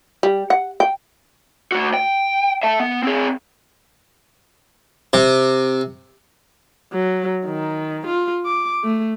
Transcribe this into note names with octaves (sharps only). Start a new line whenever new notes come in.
G3
F#5
G5
A3 F#4
G5
E5 A5
B3
C4 G#4
C3
F#3
D#3
F4
D6
A3